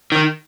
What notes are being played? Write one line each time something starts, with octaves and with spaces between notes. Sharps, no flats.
D#3